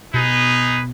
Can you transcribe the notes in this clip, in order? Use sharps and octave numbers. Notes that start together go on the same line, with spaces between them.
B2 D#4 G#4 B4